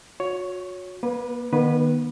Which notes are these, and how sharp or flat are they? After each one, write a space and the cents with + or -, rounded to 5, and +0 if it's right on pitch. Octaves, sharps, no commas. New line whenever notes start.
F#4 -35 C#5 +10
A#3 +40 B4 -5
D#3 -25 B3 -45 B4 +0